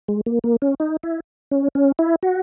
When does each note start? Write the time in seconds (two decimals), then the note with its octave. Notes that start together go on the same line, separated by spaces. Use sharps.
0.08 G#3
0.26 A#3
0.44 A#3
0.62 C#4
0.80 D#4
1.03 E4
1.51 C#4
1.75 C#4
1.99 E4
2.23 F#4